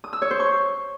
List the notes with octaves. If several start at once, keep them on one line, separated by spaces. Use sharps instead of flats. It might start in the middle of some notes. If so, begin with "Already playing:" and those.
D#6
E6
C#5
C5
C#6